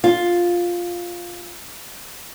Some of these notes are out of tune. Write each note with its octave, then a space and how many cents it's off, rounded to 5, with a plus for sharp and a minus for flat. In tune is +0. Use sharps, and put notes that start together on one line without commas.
F4 +5